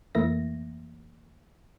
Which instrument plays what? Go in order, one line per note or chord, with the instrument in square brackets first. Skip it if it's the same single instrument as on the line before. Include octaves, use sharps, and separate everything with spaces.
[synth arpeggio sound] F2 E3 A3 A#3 E5 A#6